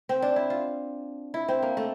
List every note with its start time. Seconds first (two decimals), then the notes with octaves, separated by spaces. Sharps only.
0.09 C4
0.22 D4
0.36 E4
0.50 F4
1.34 E4
1.48 C4
1.62 A#3
1.77 A3